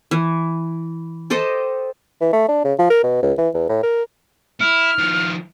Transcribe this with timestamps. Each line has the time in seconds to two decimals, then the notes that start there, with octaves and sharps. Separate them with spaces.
0.11 E3
1.30 G4 A4 C5 D#5
2.21 E3
2.33 A3
2.49 D4
2.64 C#3
2.79 F3
2.90 A#4
3.03 B2
3.22 C#2
3.38 E3
3.54 E2
3.69 A2
3.83 A#4
4.61 E4 F6
4.98 D#3 F3